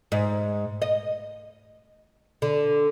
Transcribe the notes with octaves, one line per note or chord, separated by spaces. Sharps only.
G#2
D#5
D3